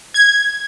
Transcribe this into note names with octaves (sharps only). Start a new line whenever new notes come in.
G#6